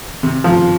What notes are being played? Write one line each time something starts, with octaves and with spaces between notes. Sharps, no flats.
C3
F3